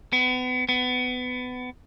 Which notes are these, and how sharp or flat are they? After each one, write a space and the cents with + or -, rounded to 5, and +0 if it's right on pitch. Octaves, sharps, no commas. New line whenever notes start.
B3 +35
B3 +25